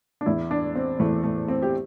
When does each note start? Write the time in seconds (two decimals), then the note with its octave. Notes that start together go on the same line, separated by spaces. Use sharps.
0.21 D4
0.26 E2 E3 E4
0.51 D4
0.76 C4
1.00 E2 E3 A3
1.23 A3
1.48 C4
1.62 G4